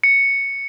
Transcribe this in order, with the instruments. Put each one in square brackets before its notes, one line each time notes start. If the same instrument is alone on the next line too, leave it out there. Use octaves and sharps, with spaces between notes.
[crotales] C#7